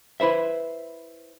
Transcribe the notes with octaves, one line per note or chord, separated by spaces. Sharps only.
E4 B4 C5 E5